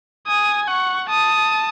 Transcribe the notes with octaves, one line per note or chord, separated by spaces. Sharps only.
G#5 D#6
F#5 C#6
A5 D#6